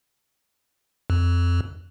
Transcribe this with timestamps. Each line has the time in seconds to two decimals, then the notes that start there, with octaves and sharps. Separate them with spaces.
1.10 F2